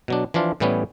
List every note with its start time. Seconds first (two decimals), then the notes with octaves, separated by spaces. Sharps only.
0.08 B2 F#3 D4
0.34 E3 F3 D4 F4
0.60 A2 E3 G3 B3 C#4